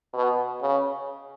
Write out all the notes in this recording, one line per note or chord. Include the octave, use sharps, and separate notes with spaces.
B2
C#3